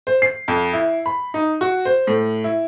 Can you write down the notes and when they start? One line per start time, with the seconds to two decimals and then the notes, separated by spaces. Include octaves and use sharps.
0.07 C5
0.22 C7
0.48 F2
0.73 E4
1.06 B5
1.34 D#4
1.61 F#4
1.85 C5
2.07 A2
2.44 E4